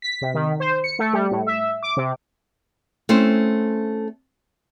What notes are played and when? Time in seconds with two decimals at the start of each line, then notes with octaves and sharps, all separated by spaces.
0.02 B6
0.21 C3
0.34 D#3
0.60 C5
0.84 C#7
0.99 A3
1.13 G3
1.31 A2
1.47 E5
1.83 D6
1.97 C3
3.09 A3 C4 C#4 E4 C5